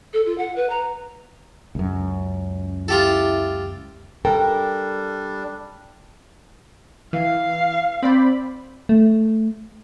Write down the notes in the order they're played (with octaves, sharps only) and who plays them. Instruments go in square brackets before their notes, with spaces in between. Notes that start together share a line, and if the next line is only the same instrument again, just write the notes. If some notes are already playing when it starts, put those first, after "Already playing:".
[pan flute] A4
F4
F#5
B4
A#5
[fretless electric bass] C#2 F#2 [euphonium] C#4
[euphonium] E4 [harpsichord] F4 G4 A4
[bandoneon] G3 D4 [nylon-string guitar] A4 A#4 [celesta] G5
[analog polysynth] E3 [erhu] F5
[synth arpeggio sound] C4 D5 [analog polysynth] C5 B5
[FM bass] A3